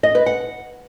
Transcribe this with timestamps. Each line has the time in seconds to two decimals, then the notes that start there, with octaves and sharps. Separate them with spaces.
0.03 D#5
0.15 B4
0.26 F#5